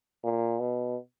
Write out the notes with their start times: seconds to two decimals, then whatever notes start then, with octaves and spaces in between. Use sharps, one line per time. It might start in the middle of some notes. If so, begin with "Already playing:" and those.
0.24 A#2
0.59 B2